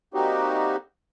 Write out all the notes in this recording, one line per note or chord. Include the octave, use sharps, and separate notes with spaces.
G3 A#3 C4 D#4 F#4 G4